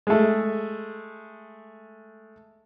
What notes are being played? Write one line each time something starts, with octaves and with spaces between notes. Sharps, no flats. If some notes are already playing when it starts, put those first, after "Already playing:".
G#3 A3